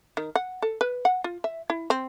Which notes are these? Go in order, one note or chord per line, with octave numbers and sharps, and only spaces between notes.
D#3
F#5
A4
B4
F#5
F4
E5
E4
C4